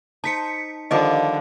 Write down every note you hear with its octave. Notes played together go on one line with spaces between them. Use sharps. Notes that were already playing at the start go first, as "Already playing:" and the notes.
D#4 C5 A5 B6 C#7
D3 D#3 F3 G3 D#5 D6